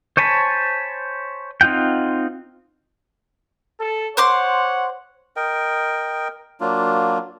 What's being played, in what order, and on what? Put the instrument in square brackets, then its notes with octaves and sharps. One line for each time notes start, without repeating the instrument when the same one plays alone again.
[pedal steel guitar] C5 C#5 G#5 A5 B5
C4 D#4 F4 F#5 G5
[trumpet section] A4
[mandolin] C5 C6 D6 [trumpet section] C#5 F#5
[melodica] A#4 D#5 G5
F#3 A#3 D4 F4